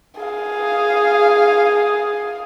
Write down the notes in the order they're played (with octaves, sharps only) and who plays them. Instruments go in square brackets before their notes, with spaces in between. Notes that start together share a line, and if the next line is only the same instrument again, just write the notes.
[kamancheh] G#4 F5